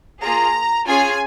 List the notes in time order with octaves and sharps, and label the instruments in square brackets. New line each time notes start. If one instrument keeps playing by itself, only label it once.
[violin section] A#3 F4 G#4 A#5
C#4 F4 G#4 G#5